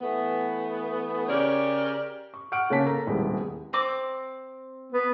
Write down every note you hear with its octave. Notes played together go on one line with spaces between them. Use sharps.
E3 A3 B3
C#3 G4 A#4 C#5 D5
C#6
F#5 C#6 F6 D7
C#3 A#3 C#4 A5 B6
A4 A#4 A#5
D#1 C2 G#3 B3
C4 D6
B3